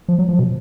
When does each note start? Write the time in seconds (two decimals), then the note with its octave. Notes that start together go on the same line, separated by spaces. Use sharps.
0.08 F3
0.18 F#3
0.29 F3
0.39 B2